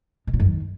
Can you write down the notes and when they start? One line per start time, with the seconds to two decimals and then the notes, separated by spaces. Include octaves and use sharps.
0.27 B2
0.33 A#2
0.40 F#2
0.46 D#3